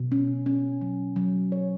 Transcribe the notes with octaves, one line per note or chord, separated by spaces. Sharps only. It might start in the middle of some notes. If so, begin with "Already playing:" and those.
Already playing: B2
C#4
C#4
F#3
F#3
C#5